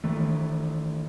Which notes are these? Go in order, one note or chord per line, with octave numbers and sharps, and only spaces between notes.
D#3 E3 A3